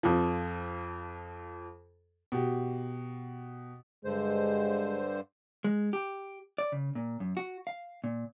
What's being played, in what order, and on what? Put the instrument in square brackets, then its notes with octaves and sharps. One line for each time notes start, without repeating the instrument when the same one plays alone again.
[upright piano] F2 F3
[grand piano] B2 G4
[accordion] G2 D3 C5 [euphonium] G#3
[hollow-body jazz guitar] G#3
G4
D5
C#3
A#2
F#2
F#4
F5
A#2